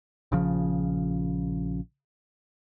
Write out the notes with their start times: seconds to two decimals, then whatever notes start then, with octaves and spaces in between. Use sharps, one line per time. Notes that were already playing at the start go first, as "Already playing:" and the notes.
0.32 A#1 C#3 F3